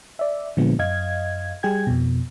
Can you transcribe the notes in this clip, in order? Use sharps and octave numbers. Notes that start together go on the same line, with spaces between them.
D5 E5
A#2 D3 F3 G#3 B3
F#2 D#5 F5 G#6
G3 G#4 G5 G#6
F2 B2